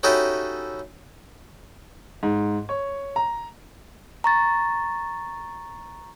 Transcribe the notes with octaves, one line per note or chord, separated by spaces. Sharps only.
C#4 D#4 E4 F#4 G4 A4
G#2
C#5
A#5
A#5 C#6 A6